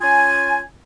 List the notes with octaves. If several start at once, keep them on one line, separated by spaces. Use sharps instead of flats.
C#4 F4 G#5